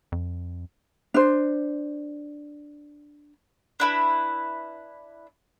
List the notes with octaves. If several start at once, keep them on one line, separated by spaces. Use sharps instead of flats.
F2
D4 C5
D4 E4 B4